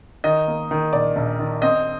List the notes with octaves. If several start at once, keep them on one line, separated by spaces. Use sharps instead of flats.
D#3 D#5
A#3
D#3
A#1 D5
A#1
D#3
C4 D#5